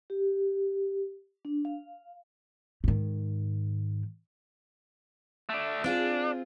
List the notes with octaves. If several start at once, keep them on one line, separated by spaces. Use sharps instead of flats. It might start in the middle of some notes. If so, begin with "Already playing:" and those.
G4
D4
F5
G#2 D#3
A3 D4
C4 D4 F4 G#4